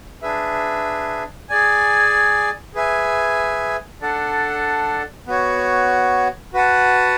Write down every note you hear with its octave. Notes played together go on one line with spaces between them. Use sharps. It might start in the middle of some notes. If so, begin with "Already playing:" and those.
D4 G#4 B4 E5
G#4 D5 G#5
G#4 B4 E5 G#5
D4 A4 D5 F#5 A5
B3 F#4 C#5
F#4 B4 F#5 A5